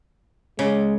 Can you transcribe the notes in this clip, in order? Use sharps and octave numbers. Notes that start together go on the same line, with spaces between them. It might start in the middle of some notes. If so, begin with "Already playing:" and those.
C#3 G#3